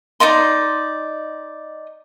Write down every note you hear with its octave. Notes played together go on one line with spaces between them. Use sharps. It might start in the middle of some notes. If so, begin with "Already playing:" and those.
D#4 D5 D#5 C6